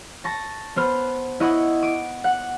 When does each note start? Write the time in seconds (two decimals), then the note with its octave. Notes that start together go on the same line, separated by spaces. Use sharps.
0.24 A5 C#6 A#6
0.76 B3 C5 F6
1.40 E4 D#5 F#5 C#6 D#6
1.82 D6 D#7
2.24 F#5